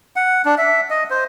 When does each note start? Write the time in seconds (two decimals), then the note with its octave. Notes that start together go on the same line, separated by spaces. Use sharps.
0.16 F#5
0.45 D4
0.58 E5
0.90 D#5
1.10 C5